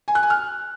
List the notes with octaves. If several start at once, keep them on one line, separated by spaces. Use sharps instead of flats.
G#5
F#6
G#5
F6